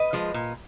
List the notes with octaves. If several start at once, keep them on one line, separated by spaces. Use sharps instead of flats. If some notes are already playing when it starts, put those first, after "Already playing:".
Already playing: B4 D#5
F3 G#3
A#2